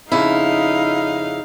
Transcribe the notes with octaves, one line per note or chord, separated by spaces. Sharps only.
F2 C#3 D#4 E4 F5